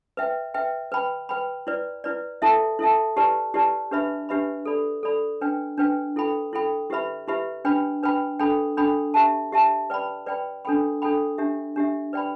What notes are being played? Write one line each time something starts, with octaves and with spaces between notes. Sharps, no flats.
B4 E5 G5
B4 E5 G5
B4 G5 B5
B4 G5 B5
E4 B4 D5
E4 B4 D5
E4 A4 E5 A5
E4 A4 E5 A5
E4 G4 B4 D5 A5
E4 G4 B4 D5 A5
D4 G4 B4 E5 B5
D4 G4 B4 E5 B5
A4 D5 B5
A4 D5 B5
D4 B4 G5
D4 B4 G5
E4 A4 G5 B5
E4 A4 G5 B5
E4 G4 B4 E5 B5
E4 G4 B4 E5 B5
D4 B4 G5 B5
D4 B4 G5 B5
D4 A4 G5 B5
D4 A4 G5 B5
G4 E5 A5
G4 E5 A5
B4 D5 G5 B5
B4 D5 G5 B5
D4 A4 G5 B5
D4 A4 G5 B5
D4 G4 E5
D4 G4 E5
B4 D5 G5 B5